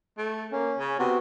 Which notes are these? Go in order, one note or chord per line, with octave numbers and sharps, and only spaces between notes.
A3
A#3 C#4
C#3
C3 B3 F#4